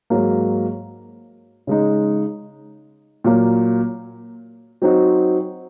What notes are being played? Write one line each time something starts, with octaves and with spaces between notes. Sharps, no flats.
G#2 F#3 A#3
C#3 G#3 D#4
A#2 F#3 A#3
F#3 C4 D#4 F#4